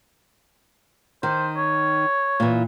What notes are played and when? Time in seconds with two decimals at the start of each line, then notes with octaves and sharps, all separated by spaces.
1.23 D#3 C5
1.57 C#5
2.40 A#2 E3